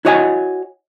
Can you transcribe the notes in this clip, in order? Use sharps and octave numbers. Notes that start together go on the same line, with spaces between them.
E4 F#4 C#5 D#5 F5 G#5